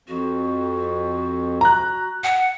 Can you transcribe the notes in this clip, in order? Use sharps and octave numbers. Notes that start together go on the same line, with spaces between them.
F2 F#4
A#5 F#6
F#5